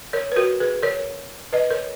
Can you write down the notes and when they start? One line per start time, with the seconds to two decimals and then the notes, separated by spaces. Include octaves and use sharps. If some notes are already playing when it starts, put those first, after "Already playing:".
0.13 A#4 C#5
0.32 B4
0.36 F#4 A#4
0.60 G#4 B4
0.83 A#4 C#5
1.53 B4 D#5
1.70 A#4 C#5